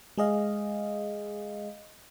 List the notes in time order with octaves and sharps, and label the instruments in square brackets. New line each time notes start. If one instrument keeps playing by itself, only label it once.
[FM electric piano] G#3 G#4 D#5 F5